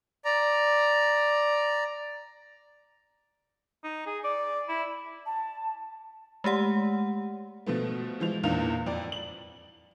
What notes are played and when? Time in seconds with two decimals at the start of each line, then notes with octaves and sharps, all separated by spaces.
0.25 D5 A#5
3.84 D#4
4.06 G#4
4.24 D5
4.69 E4
5.26 A5
6.44 G#3 A3 G4 F#5
7.66 B2 F3 A3 B3
8.20 E3 F3 G#3 F7
8.44 E2 A#2 D4 D#4 F5 F7
8.86 F2 D5
9.12 F#7